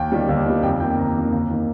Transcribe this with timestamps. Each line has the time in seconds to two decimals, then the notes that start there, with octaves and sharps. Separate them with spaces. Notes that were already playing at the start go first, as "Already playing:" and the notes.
Already playing: D#2 G5
0.12 D#3 G3
0.29 D#2
0.45 D#3 G3
0.63 F2 G5
0.80 D#3 A#3 G5
0.97 F2 A#5
1.15 D#3 A#3
1.32 D#2
1.50 D#3 A#3